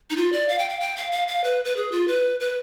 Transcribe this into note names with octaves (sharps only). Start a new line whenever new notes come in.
D#4
F4
D5
F5
G5
F5
G5
F5
F5
F5
B4
B4
G#4
F4
B4
B4